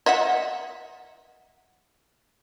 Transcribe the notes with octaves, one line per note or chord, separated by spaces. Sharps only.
D#5 E5 F#5